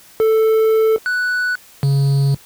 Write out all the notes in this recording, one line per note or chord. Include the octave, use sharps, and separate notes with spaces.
A4
F#6
C#3